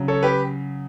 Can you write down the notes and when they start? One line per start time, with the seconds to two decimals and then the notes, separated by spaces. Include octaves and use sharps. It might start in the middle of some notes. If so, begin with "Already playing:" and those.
Already playing: C#3 F#3
0.08 A4 C#5
0.23 G4 B4